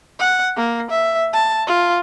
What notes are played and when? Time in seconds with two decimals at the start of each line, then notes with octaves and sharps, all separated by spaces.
0.19 F#5
0.56 A#3
0.91 E5
1.33 A5
1.67 F4